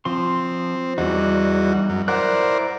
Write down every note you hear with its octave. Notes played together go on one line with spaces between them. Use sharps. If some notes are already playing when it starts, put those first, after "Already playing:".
F3 C4 C6
E2 G3 D#4 F#4
F#2
E4 A#4 C5 D5 F#5 F#6